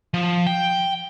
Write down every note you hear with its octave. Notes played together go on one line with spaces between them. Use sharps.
F3
G5